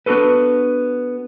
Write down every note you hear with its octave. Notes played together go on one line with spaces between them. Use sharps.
B3 D4 F#4 A4 B4